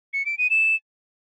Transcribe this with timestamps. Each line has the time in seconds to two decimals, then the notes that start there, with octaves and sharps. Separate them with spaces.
0.13 C#7
0.26 D7
0.38 D#7
0.50 E7